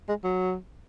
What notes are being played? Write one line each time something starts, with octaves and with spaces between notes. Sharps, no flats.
G#3
F#3